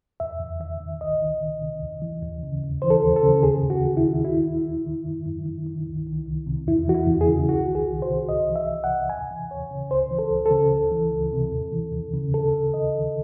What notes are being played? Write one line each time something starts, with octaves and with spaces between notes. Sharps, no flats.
E2 E5
E2
D#3 E5
D#3
C2 D#5
D#3
C2
C3
D#2
E3
D#2
C#3
D#2
E3 C5
A4
D#2
A4
C#3
D#2 G#4
D#2
F#4
D#3
E4
D#3
D#2 E4
D#2
D#3
D#3
F#2
F#2
D#3
D#3
C2
D#3
C2
C3
E2 E4
E3 F#4
E4
E2
G#4
C#3
C2 F#4
D#3
G#4
C2
C5
C3
C2 D#5
E3
E5
C2
F#5
C3
D#2 G#5
E3
D#2 C#5
C#3
C#2 C5
E3
A4
C#2
A4
C#3
C#2
E3
C#2
C3
D#2
E3
D#2
C#3
D#2 A4
D#2
D#3 D#5
D#3